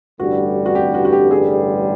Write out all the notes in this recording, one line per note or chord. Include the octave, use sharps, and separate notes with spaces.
A1 G2 D3 G3 F#4
F#4
G4
F#4
F#4
G4
G#4